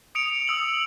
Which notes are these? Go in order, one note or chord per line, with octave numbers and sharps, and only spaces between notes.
D#6 C#7 D7 F7
D#6 E6 F#7